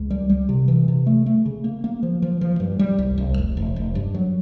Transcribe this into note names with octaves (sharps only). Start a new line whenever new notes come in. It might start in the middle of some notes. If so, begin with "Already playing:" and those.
Already playing: C#2
G3
G3
C3
E3
C3
A3
A3
C#3
A#3
A#3
F3
F3
F3
G2
G3
C2
C2
F1
F1
F1
G2
F#3